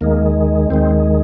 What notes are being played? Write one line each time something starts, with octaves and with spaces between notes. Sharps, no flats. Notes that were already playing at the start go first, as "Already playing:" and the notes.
D#2 D#3 G#3 A#3
D#2 D#3 G#3 C4